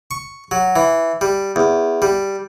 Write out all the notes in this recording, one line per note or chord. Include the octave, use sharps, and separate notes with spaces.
C#6
F#3
E3
G3
E2
G3